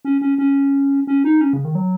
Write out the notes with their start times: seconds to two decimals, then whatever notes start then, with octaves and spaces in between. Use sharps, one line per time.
0.05 C#4
0.22 C#4
0.38 C#4
1.07 C#4
1.24 D#4
1.41 C#4
1.53 C#3
1.65 D#3
1.75 F#3